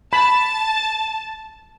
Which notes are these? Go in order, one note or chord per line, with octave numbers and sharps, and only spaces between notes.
A5 B5